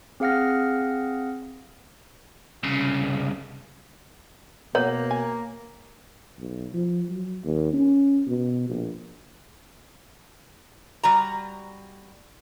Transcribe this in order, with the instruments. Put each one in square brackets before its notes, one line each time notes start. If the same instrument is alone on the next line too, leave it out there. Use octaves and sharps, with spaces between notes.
[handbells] C4 G#4 F5 F#5 F6 A#6
[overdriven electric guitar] C2 C#3
[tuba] B2 [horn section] A#3 [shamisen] B3 [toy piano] C#5
[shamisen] G#5
[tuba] B1
F3
F#3
D#2
C#4
B2
A#1
[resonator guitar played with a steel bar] G3 F#4 A#5